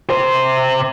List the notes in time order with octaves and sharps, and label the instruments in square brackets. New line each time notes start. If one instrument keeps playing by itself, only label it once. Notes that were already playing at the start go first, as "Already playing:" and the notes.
[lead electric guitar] C3 C5